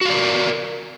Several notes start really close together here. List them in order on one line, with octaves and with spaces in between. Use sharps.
F#4 F5 D5 A#4